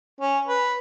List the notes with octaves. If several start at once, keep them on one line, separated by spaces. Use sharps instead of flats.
C#4
B4